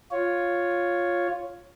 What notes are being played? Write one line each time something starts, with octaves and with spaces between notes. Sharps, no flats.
F4 C#5